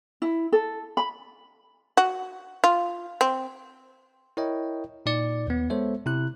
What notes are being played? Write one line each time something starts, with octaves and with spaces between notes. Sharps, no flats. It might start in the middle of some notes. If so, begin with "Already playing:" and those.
E4
A4
B5
F#4
F4
C4
E4 A#4 C#5 D#5 G5
A#2 D#4 D5 C#7
D#2 B3
G#3 B3 A4 C5 C#5 E5
C3 E4 F#6